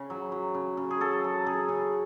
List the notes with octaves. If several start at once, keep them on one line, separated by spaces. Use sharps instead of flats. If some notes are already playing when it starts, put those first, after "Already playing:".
Already playing: C#3
F#3
F#3
C#3
C#3
G#4
F#3 A4
F#3
C#3 G#4
C#3